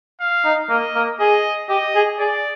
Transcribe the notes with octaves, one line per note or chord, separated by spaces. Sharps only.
F5
D#4
A#3 D#5
A#3
G#4 D#5
G4 D#5
G#4
G#4 D5